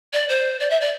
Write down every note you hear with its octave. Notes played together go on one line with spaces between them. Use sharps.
D5
C5
D5
E5
D5